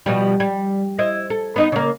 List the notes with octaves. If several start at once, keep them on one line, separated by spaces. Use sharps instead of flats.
B2 F3 G3
G3
E4 C5 D#5
A4
B3 D#4 D#5
C#3 A#3